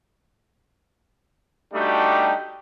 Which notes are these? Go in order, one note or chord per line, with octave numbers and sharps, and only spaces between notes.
G3 A3 D4 D#4 F#4 G4